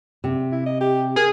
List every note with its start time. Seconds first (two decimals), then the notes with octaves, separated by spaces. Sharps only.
0.24 C3
0.52 E4
0.66 D#5
0.81 G4
1.16 G#4 A#4